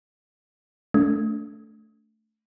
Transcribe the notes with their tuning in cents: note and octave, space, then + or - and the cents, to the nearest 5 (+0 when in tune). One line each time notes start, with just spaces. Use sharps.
A3 +0 D4 -35